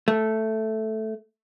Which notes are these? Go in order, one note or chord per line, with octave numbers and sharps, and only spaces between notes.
A3